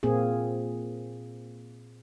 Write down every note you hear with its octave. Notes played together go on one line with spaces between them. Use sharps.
A#2 A#3 C4 G#4